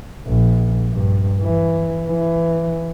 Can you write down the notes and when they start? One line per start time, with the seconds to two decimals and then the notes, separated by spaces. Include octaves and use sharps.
0.27 A#1
0.92 G2
1.41 E3
2.08 E3